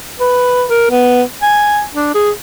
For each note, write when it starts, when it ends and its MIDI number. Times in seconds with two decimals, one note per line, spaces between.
0.20 0.64 71
0.70 0.87 70
0.90 1.23 59
1.42 1.83 80
1.94 2.13 62
2.15 2.31 68